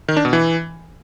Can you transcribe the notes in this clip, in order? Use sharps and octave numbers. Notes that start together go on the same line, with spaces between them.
D#3
D4
B2
E3